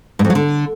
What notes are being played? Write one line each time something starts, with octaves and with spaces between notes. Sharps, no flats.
G2
F2
F#3
D3